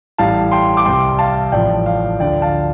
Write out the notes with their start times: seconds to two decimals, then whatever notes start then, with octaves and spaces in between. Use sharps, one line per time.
0.18 A1 A2 G3 F5 A5
0.52 G5 C6
0.77 D6
0.85 C2 C3 G3 G5 C6
1.19 F5 A5
1.52 A1 A2 F3 D5 G5
1.86 F5
2.20 D2 D3 F3 D5 G5
2.42 F5 A5